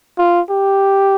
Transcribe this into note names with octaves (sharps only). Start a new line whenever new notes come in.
F4
G4